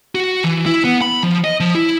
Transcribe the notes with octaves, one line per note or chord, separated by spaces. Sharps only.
F#4
E3
E4
B3
B5
F3
D#5
F3
E4